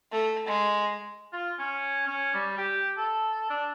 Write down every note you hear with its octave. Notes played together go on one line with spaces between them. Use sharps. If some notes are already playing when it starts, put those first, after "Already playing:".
A3
G#3
F4
C#4
C#4
G3
G4
A4
D4